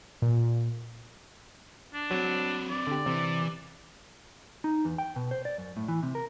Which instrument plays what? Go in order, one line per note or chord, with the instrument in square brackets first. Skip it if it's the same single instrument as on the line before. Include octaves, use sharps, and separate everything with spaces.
[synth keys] A#2
[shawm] D4
[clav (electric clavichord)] F#3 [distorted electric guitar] C4 B4
[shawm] D5
[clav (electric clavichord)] D3 G4
[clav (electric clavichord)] C3 [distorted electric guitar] E3
[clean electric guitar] D#4
E2
G5
B2
C5
D5
F#2
A2
E3
C3
A#4